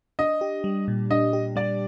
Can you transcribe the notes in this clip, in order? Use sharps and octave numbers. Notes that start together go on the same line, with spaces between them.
D4 D#5
G4
G3
A#2
D4 D#5
G4
G3 D5